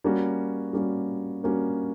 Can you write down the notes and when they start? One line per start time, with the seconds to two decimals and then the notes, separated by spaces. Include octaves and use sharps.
0.04 G3 A#3 C#4 F#4
0.73 G3 A#3 C#4 F#4
1.44 G3 A#3 C#4 F#4